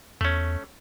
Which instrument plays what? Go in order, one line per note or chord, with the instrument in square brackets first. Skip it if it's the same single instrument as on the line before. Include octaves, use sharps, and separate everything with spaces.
[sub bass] E2 [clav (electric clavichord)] A3 C#4